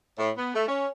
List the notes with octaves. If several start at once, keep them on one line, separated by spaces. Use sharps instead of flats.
A2
B3
A3
C#4